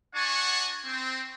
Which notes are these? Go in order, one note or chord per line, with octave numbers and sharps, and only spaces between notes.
D4 F#4 F#5 G#5 A5 C#6
C4